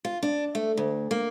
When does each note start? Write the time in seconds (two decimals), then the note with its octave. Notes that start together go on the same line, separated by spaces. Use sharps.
0.05 F4
0.23 D4
0.55 A3
0.77 D2
1.11 A#3